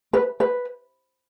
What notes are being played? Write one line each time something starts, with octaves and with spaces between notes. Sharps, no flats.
B4
B4